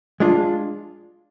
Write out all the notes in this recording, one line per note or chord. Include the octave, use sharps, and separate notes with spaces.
G#3 D4 F4